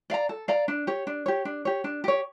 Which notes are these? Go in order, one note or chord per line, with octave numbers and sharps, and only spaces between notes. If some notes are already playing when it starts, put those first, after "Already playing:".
D5 F5 A#5
A4
D5 F5 A#5
D4
G4 C#5
D4
G4 C#5
D4
G4 C#5
D4
G4 C#5